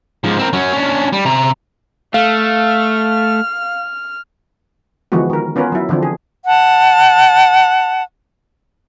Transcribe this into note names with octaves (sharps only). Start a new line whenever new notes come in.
G#2 F3
C4 A#4
F#3 C#4
C#4 D4
G3
C3 A#5
A3 F5 F6
D3 E3 F3 G#3 B3 F#4
D#3 A#4
B3 C#4 F4 A#4 B4
F#3 E4
D3 E3 F3 C4 D4
G#4
F#5 A5